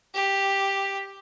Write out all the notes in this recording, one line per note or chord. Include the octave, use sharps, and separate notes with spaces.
G4